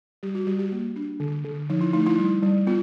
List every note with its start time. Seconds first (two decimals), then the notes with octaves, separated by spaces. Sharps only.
0.23 G3 G4
0.35 F#4
0.47 G3 G4
0.59 G4
0.72 A#3
0.96 D4
1.20 D3
1.45 D3
1.70 F3 D#4
1.81 E4
1.93 A3 D#4
2.06 E4
2.18 G3
2.42 G3
2.67 B3 F4